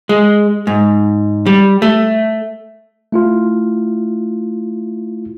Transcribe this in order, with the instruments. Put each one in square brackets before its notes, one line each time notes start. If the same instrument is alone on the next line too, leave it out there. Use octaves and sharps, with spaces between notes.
[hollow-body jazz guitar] G#3
G#2
G3
A3
[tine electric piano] A3 E4 F4